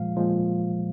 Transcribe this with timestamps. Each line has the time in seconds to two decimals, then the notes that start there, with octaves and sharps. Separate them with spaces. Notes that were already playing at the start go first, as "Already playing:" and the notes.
Already playing: A#2 F3 G#3 F5
0.16 A#2 F3 G#3